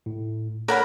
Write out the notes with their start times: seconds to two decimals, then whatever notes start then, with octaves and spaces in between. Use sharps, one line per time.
0.06 A2
0.68 A#4 C#5 F#5 B5